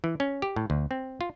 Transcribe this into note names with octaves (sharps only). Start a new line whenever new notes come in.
E3
C#4
G4
A2
D2
C4
F4